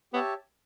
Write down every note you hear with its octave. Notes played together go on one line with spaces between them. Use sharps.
B3 G4 C#5 E5 A5